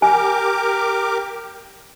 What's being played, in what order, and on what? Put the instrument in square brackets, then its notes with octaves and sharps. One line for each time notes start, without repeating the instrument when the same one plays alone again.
[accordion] G4 A#4 D6 [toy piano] G#5